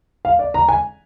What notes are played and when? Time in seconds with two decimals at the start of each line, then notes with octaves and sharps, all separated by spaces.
0.25 F5
0.39 D5
0.54 A#5
0.69 G#5